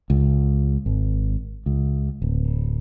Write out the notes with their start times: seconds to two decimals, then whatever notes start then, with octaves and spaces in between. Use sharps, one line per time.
0.10 C#2
0.86 G#1
1.66 C#2
2.22 D1